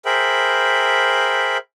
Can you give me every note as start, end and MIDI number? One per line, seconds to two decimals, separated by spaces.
0.05 1.58 68
0.05 1.58 70
0.05 1.58 72
0.05 1.58 76
0.05 1.58 79
0.05 1.58 83